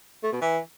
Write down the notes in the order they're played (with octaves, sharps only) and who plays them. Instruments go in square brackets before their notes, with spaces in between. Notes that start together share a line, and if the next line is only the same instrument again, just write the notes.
[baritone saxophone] A3
B2
E3